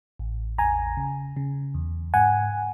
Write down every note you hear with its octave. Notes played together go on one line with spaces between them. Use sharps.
A1
E2 G#5 A#5
C#3
C#3
E2
G#2 F#5 G#5